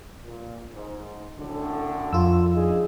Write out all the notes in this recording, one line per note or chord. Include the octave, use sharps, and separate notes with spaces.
A#2
G#2
F#2 A2 D3
F2 F4 E6
D4 D#4 G#4